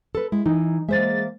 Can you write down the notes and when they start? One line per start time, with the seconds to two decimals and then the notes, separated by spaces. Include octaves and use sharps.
0.15 A4 B4
0.32 G#3 E4
0.46 E3 D#4
0.89 G#3 A#3 C5 E5 A6